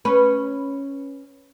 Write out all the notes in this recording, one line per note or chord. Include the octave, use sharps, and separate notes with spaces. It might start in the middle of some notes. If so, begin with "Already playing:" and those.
C#4 B4